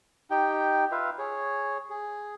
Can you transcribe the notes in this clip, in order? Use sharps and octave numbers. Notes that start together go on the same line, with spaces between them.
D#4 G4 G5
F4 B4 E5 F5
G#4 C#5
G#4